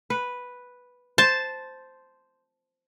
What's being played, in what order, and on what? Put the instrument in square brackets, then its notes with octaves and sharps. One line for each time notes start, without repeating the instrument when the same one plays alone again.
[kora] B4
[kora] C5 [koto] A5